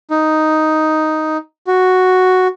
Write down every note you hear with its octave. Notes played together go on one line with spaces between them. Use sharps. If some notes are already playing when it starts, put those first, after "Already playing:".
D#4
F#4